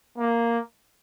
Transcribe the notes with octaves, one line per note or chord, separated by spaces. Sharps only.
A#3